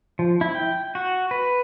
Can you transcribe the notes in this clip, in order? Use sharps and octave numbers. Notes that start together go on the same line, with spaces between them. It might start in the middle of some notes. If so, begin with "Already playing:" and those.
F3
E4
G5
F#4
B4